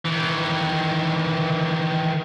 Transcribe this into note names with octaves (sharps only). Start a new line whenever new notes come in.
D#3 E3